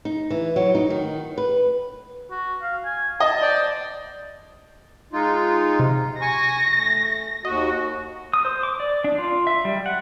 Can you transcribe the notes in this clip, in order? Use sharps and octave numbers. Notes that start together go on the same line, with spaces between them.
D#4
E3
F#3
D#4
D#3
B4
F#4
F5
G#5
D#5 A5
C5 D5
G#3 D#4 F4
C3
G#5 C#6 A#6
A3
D#2 F#4 D#5
D#6
C5
D6
D5
D4
F4
E5
G3
F#5